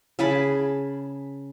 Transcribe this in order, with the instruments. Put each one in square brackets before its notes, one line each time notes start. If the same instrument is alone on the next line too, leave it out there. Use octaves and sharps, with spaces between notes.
[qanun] C#3 G#4 A5 B5